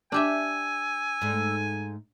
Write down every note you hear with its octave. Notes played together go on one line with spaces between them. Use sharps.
D4 G4 E5 G#5 E6
G#2 A3